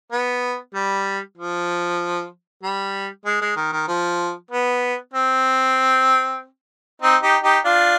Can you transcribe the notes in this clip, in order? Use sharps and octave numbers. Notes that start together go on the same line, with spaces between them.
B3
G3
F3
G3
G#3
G#3
D#3
D#3
F3
B3
C4
C4 D#4
D#4 G4
D#4 G4
D4 F4